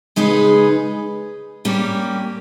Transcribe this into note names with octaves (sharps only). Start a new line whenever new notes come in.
C#3 G#3 D#4 G#4 B4
G3 A#3 C#4 G4